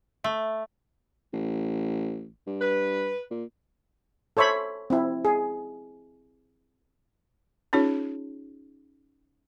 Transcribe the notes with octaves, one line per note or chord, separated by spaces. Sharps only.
A3
A1
G2
B4
A#2
A4 C5 C#5 E5 B5
C4 E4
G#4
C#4 D#4 F4 G#4 C#5